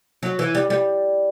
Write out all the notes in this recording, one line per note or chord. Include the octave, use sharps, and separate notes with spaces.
F#3
E3
G3
G3